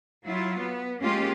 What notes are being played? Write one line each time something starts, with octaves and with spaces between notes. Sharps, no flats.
F#3 E4 F4
B3
G#3 A#3 C#4 F4 G4